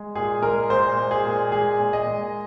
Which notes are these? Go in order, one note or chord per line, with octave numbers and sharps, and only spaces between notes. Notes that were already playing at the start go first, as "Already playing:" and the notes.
Already playing: G#3
A#2 G#4
G#3 A#4
A#2 C5
G#3
G#4
A#2
G#3 G#4
A#2
D#5
G#3